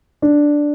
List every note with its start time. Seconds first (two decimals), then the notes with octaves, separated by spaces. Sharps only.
0.22 D4